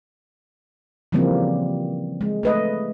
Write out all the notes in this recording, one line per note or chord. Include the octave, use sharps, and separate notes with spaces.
C#3 E3 F3 G3 A#3 C4
G#3
A3 B4 D#5